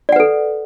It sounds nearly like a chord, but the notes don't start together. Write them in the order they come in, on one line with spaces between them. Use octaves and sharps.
D5 F#5 B4 A4